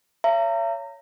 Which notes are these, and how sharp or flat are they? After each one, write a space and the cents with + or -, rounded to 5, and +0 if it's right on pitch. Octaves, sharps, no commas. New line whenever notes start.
C#5 +20 E5 +45 A#5 -30